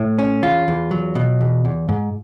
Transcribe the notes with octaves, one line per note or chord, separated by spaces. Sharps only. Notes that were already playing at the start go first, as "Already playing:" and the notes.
Already playing: A2
C#4
E2 F4
E2
F#3
B2
E2
E2
G#2